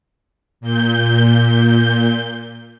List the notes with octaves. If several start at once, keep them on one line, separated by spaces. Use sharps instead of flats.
A#2 G6